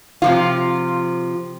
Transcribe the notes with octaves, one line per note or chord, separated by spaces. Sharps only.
C3 F3 F4